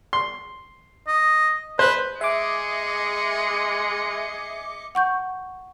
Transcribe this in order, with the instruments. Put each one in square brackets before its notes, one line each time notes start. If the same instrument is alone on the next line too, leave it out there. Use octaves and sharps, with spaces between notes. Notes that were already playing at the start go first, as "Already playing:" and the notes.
[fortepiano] C6
[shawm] D#5
[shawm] B4 [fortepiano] C5
[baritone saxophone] G#3 [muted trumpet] G#4 [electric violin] D#5 C#7 [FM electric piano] E5 D6
[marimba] F#5 C#6 G6